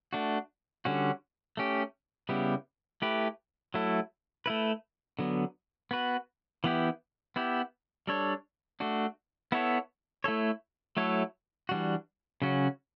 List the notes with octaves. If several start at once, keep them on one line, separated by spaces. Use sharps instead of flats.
A3 D4 F#4
D3 G3 C#4 F#4
A3 C#4 G4
C#3 G3 B3 E4 G4
A3 E4 G4 B4
F#3 A3 E4 A4
A3 E4 B4
D3 F#3 B3
B3 F#4 B4
E3 B3 E4 G4
B3 E4 G4
G3 D4 A4 C#5
A3 D4 F#4
B3 E4 A4 C#5
A3 E4 A4 C#5
F#3 A3 E4 A4 C#5
E3 G3 D4 F#4
C#3 F#3 C#4 F#4